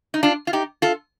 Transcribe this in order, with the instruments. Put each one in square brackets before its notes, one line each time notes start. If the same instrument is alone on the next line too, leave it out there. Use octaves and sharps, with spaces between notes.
[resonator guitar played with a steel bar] D#4
D4 F4
F4
D#4 G4
F4 A4